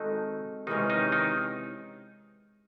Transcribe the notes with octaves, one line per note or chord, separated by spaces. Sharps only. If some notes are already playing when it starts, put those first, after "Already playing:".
Already playing: D#3 G#3 C4 D#4 F#4 A4
C3 D#3 E3 G#3 C#4 D#4
D#3 D#4
D#3 D#4